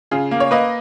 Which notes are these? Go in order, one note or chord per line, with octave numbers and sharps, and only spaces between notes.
C#3 F4 G#4
A#3
C#5
A#3 B4 D#5